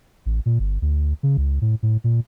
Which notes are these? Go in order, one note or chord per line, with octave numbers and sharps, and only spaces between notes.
A1
A#2
G1
D2
C#3
C#2
A2
A2
A#2